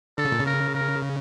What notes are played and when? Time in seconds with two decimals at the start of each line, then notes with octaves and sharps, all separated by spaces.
0.18 D3 A4
0.25 C#3
0.32 A#2
0.40 C#3
0.46 A#4
0.74 A#4